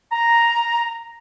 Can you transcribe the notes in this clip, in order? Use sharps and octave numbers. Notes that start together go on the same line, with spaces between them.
A#5